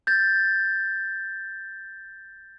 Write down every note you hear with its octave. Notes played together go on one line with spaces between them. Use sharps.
G6 A6